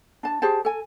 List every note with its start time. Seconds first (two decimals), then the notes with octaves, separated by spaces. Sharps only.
0.23 D4 A5
0.42 G4 G#4 C5 A5
0.65 A4 G#5